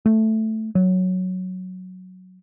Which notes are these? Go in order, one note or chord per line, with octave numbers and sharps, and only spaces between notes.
A3
F#3